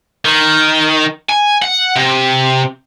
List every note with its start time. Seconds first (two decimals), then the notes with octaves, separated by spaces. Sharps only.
0.25 D#3
1.30 G#5
1.62 F#5
1.96 C3